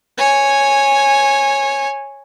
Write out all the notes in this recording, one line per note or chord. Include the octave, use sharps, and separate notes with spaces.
C#5 G#5